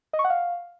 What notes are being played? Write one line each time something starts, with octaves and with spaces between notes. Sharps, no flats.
D#5
C#6
F#5
F5